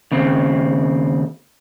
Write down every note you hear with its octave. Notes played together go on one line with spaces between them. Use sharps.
D#2 C#3 C4